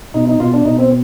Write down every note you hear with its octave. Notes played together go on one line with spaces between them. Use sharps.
B2 D#4
D#4
B2 F4
D4
B2 D#4
C4